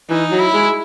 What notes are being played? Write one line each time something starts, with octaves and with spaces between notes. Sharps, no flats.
E3 D#4
F#3
E4
G#3